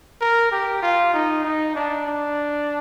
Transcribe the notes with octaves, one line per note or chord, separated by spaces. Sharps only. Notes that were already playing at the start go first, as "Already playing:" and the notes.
A#4
G4
F4
D#4
D#4
D4
D4